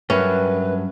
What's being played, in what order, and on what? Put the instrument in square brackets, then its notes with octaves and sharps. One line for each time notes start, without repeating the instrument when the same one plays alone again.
[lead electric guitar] G2 F#3 [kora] C#4 [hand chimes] A#4 E5 B5 [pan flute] B4